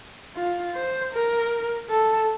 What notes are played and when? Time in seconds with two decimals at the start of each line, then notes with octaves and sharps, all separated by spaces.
0.36 F4
0.75 C5
1.13 A#4
1.90 A4